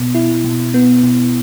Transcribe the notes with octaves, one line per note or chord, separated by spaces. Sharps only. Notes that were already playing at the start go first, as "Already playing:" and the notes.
Already playing: B2 B3
E4
B2
B3
B2